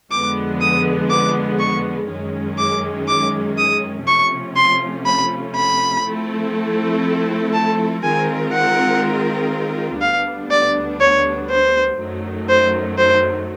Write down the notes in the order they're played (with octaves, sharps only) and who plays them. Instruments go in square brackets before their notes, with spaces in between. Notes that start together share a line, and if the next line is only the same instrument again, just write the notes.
[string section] F2 D3 F3 G#3 B3 [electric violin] D6
[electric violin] D#6
D6
C#6
[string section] F#2 D#3 G#3 C#4
[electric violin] D6
D6
D#6
[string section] C3 F3 A3 C#4 F4 [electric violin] C#6
[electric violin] C6
B5
B5
[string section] F3 A3 C4 E4 A4
[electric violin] A5
[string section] D#3 G#3 C4 F4 A#4 [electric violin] G#5
[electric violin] F#5
[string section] D2 D3 G3 B3 D4 [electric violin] F5
[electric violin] D5
C#5
C5
[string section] F#2 D#3 F#3 A3
[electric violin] C5
C5